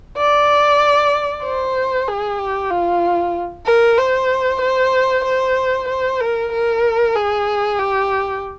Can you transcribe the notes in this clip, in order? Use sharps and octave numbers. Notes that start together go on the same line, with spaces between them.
D5
C5
G#4
G4
F4
A#4
C5
C5
C5
C5
A#4
A#4
G#4
G4